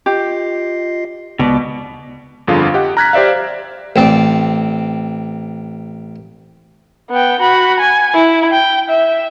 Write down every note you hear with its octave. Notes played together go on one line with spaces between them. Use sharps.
F4 G4 D#5 C7
C#2 B2 G#3 D5 D6
G1 F2 D3 F4 G#4 F5
G4 D#5 F#5
A#5 F6 F#6 G#6 A#6 B6
G4 C5 D5 E5 F5
A1 C4 D5
B3 G5
F#4 B5
G#5
E4
G5
E5